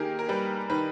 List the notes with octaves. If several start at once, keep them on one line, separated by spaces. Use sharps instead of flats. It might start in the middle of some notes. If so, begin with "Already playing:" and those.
Already playing: D#3 A#3 G4 G#4 A#4
A#4
G3 B4
D#3 B4